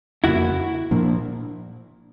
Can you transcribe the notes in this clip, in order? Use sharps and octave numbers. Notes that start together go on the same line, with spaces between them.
F2 C#3 F3 A#3 E4 F#4
A#2 F3 A#3 D4